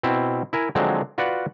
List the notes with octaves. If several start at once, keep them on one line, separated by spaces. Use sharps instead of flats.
B2 C4 E4
E4 A#4 G#5
D3 F3 F#3 G#3 C4
F4 F#4 B4 D5 F5 F#5